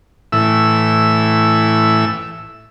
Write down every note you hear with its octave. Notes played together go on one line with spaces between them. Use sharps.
A2 E3 E6